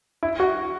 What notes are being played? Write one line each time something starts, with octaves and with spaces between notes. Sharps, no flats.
E4
F#4